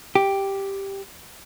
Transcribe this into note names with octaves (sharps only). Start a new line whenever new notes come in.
G4